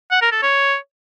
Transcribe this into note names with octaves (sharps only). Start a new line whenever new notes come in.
F#5
A#4
A4
C#5